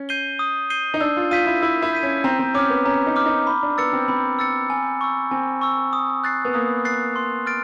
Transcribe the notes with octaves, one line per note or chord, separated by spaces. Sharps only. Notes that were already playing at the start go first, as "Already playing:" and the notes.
Already playing: C#4
G6 C7 D#7 G7
D#6
G6 C7 D#7 G7
D#4
D4 E6
F4
F4 G6 B6 D#7
E4
E4 E6
E4
G6 B6 D#7
C#4
C4 A#5
C4
C#4 D6 F6
B3
C#4 A#5
D#4
D6 F6
D#4
B5
D4
B3 E6 A6 C#7
C4
C4 B5
E6 A6 C#7
G#5
C#6 E6
C4 G#5
C#6 E6
D#6
F#6 A6 C7
B3
A#3 D#6
F#6 A6 C7
C6
F6 A6 D7